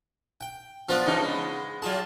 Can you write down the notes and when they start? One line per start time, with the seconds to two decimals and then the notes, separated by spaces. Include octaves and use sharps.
0.41 G5
0.89 F3 B3 D4 F4
1.06 C#3 E3 D4 D#4
1.21 G#3 B3
1.82 F#3 F4 G#4 A5